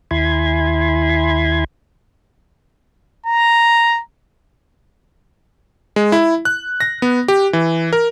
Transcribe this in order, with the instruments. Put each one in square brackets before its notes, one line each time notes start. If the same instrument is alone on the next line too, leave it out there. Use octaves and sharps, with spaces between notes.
[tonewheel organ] D#2 E4 G#5 B5 C6 G#6
[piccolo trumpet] A#5
[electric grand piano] G#3
E4
F#6
A#6
B3
G4
E3
A#4